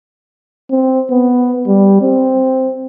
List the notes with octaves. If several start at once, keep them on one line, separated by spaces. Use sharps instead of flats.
C4
B3
G3
C4